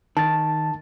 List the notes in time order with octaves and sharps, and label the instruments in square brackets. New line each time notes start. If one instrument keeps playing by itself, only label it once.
[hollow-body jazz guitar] D#3 [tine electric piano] A5 A6